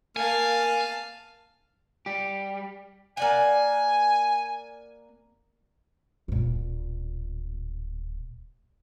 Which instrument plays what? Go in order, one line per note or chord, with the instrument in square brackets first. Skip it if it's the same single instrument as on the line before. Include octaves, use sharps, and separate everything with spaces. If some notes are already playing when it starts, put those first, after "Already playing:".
[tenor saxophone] A#3 [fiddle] F5 A5 [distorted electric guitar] G#5
[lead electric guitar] G3 G4
[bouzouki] A#3 D5 F#5 [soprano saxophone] G#5
[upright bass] D1 A#2